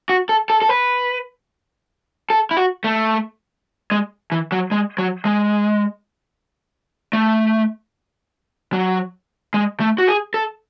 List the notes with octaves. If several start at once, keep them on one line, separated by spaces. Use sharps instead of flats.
F#4
A4
A4
A4
B4
A4
E4
F#4
A3
G#3
E3
F#3
G#3
F#3
G#3
A3
F#3
G#3
A3
F#4
G#4
A4